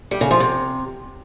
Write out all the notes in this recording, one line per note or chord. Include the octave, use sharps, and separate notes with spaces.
G3
C#3
F3
C3